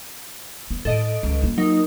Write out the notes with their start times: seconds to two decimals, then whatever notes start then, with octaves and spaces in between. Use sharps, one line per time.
0.71 B3
0.85 A2 A4 D#5 D7
1.23 C#2
1.42 A#3 F4
1.58 F#3 D#4 A#4